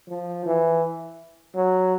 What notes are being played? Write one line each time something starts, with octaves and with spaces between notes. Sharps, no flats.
F3
E3
F#3